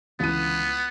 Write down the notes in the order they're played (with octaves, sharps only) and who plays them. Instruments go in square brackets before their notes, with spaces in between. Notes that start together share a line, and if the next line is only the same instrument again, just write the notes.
[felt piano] C#2 E4 D#7 [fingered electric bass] D3 E3 [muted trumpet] B3